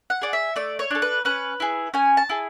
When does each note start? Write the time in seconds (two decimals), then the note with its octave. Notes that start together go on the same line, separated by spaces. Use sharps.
0.10 F#5
0.21 G#4 D5
0.33 E5
0.56 A3 D5
0.79 C#5
0.91 D4 A4
1.02 B4
1.25 C#4 B4
1.60 E4 G#4
1.94 C#4 G#5
2.17 A5
2.29 E4 G#4